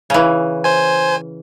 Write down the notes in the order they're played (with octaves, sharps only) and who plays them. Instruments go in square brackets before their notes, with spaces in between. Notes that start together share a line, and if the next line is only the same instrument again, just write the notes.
[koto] C#3 E3
[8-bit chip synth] C5 G#5